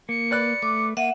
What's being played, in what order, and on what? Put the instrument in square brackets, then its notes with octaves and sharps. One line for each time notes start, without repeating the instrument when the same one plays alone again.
[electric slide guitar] A#3 [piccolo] C#7
[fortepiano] B4 D5 F#6
[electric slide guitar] A3 [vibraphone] D6
[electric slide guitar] A#3 [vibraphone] E5 F#5 [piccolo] D#7